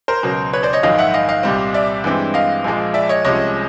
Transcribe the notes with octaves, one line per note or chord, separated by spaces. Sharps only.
A#4 C5
C#2 B2 F#3
B4 C#5
C5 D5
C#5 D#5
A#1 G#2 D#3 F#3 D#5 F5
E5 F#5
D#5 F5
D#5 F5
C2 A#2 G3 C4
D5 E5
G2 E3 G#3 C4
D#5 F5
A#1 A#2 F3 G#3
D5 E5
C#5 D#5
C2 C3 F3 G#3 C#4 C#5 D#5